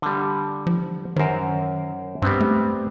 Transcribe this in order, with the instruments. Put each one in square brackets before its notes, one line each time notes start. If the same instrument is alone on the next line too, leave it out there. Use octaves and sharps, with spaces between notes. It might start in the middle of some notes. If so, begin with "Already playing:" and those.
[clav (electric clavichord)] D3 G3
[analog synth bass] F3
[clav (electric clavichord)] F#2 A#4 C5 [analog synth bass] D#3
[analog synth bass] G2 [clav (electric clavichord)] G3 B3 C4
[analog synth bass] A3